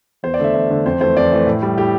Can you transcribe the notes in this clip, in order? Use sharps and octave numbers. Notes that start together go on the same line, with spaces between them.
E2 C5
D5
D3 A3 E5
E2 E5
D3 A3
F2 C5
E3 A3 C5
F2 D5
E3 A3
A2
G3
A2 G4